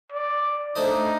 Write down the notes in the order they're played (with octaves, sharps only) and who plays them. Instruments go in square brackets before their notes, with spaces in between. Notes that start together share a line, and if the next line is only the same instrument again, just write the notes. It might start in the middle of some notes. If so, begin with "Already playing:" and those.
[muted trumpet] D5
[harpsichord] A3 D4 A4 C5 D#5 [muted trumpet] D#4